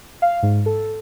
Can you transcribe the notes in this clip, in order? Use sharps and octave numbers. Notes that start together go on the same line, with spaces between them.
F5
G#2
A4